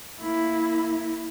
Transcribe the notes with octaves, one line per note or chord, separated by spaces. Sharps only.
A#3 E4